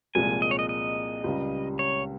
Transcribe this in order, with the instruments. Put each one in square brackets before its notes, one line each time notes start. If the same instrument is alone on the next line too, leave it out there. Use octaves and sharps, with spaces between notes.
[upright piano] C2 A#2 F3 G#3 [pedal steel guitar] G#5
[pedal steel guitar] D#5
C#5
D#5
D#5
[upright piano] C#2 C#3 G3
[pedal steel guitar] C#5